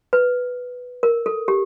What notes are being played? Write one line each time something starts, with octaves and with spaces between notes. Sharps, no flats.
B4
A#4
A4
G4